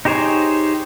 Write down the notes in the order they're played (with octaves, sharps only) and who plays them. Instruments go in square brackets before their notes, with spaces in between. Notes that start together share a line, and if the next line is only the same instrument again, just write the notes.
[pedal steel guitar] D#4 G4 G#4 C5 C#5